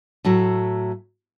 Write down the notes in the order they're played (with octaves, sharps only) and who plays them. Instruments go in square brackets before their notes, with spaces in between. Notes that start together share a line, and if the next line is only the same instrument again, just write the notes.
[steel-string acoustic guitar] A2 F#3 A3